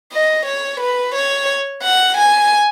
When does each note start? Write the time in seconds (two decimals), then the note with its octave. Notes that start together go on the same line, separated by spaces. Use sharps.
0.13 D#5
0.46 C#5
0.80 B4
1.15 C#5
1.83 F#5
2.17 G#5